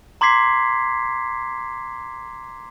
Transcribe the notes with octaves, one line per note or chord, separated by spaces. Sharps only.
A#5 C6 D6 G#6 B6 C7